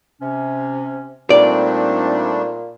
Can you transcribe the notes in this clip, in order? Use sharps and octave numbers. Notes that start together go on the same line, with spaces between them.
C3 C#4
A#2 G3 A3 C4 D4 D#4 D5